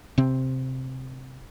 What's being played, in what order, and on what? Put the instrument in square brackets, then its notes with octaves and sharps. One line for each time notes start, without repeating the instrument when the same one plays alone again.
[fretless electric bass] C3 C4